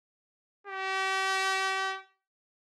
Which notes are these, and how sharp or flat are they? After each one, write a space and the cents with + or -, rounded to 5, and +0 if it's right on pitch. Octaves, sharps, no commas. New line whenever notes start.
G4 -40